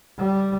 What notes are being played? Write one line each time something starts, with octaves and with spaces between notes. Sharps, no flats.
G3